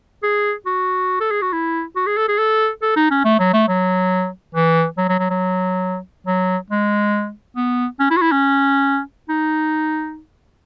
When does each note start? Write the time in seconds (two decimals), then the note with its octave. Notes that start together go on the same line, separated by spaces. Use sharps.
0.23 G#4
0.66 F#4
1.20 A4
1.31 G#4
1.42 F#4
1.53 E4
1.96 F#4
2.06 G#4
2.17 A4
2.29 G#4
2.38 A4
2.82 A4
2.96 D#4
3.11 C#4
3.25 A3
3.39 F#3
3.54 A3
3.68 F#3
4.55 E3
4.97 F#3
5.09 F#3
5.19 F#3
5.30 F#3
6.27 F#3
6.70 G#3
7.56 B3
7.99 C#4
8.10 E4
8.17 F#4
8.22 E4
8.32 C#4
9.29 D#4